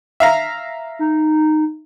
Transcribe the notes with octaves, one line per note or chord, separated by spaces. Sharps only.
E5 F5 A#5
D#4